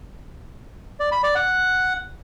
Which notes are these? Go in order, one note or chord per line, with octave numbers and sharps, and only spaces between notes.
D5
B5
D5
F#5